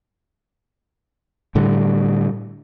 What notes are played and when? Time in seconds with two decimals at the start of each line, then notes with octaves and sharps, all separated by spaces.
1.55 A2 D3 G3